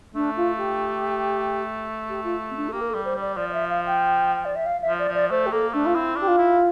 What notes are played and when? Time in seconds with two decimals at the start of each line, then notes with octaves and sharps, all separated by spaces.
0.15 A3 D4
0.36 F4
0.57 G4
2.09 G4
2.24 F4
2.50 C4
2.56 D4
2.68 A4
2.72 A#3 G4
2.81 A#4
2.89 G3 A4
3.04 C5
3.15 G3
3.21 D5
3.36 F3 D5
3.49 D5
3.53 E5
3.69 F5
3.86 G5
4.45 D5
4.55 E5
4.66 F5
4.81 E5
4.87 F3
4.99 D5
5.08 F3
5.14 D5
5.30 A3 C5
5.46 G4
5.51 A#3 A4
5.73 A3 D4
5.85 F4
5.94 C4 E4
6.16 D4 G4
6.27 F4
6.38 E4